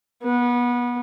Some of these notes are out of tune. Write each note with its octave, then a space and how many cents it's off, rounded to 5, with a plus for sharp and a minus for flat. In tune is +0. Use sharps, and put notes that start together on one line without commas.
B3 -25